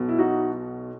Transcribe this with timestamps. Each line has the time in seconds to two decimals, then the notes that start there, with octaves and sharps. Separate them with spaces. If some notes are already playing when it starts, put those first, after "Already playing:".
Already playing: B1 B2
0.09 E4
0.19 D#4 F#4